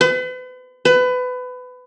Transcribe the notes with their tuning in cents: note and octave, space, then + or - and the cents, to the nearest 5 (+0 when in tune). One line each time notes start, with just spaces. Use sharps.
B4 +40
B4 +25